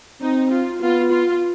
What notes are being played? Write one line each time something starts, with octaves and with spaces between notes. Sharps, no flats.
C4 D#4
F4
B3 F4
F4